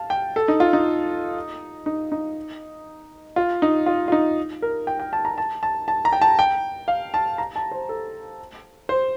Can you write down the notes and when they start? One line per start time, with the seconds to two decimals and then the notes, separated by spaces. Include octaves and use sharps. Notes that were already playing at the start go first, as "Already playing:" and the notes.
Already playing: F5 A5
0.10 G5
0.36 A4
0.48 D#4
0.60 F4
0.73 D#4
1.86 D#4
2.12 D#4
3.36 F4
3.62 D#4
3.86 F4
4.08 F4
4.12 D#4
4.62 A#4
4.87 G5
5.00 G5
5.13 A5
5.25 A#5
5.38 A5
5.63 A5
5.88 A5
6.05 A#5
6.13 G5
6.21 A5
6.39 G5
6.88 F5
7.14 A5
7.38 A#5
7.56 A5
7.71 C5
7.89 A4
8.89 C5